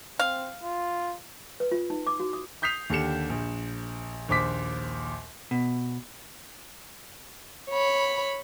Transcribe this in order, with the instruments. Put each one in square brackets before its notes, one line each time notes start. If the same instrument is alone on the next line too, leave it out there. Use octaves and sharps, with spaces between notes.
[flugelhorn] C4 [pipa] F5
[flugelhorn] F4
[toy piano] B4
F4
D#4
D6
F#4
D#6
[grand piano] D#6 G6 B6 C7 F7
D#2 D3 G4 C#7 E7
A#1
A#1 D#2 C5 D6 B6
[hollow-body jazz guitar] B2
[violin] C#5 B5